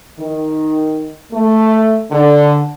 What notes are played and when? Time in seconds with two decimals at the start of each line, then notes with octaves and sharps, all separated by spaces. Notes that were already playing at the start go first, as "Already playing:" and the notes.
0.19 D#3
1.32 A3
2.11 D3